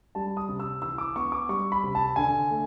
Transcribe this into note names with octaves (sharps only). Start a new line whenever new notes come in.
G3 A5
D#6
C3
E6
E3 E6
D6
B3 C#6
D6
G3 C#6
B5
C3
A5
D3 G#5
A3